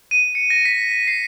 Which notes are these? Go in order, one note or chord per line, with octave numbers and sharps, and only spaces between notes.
D#7
C#7
A#6
B6
B6
C7